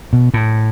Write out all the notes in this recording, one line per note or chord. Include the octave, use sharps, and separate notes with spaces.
B2
A2